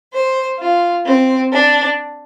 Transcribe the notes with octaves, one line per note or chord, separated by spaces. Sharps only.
C5
F4
C4
D4